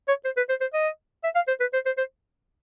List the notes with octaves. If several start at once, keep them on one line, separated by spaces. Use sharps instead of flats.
C#5
C5
B4
C5
C5
D#5
E5
F5
C5
B4
C5
C5
C5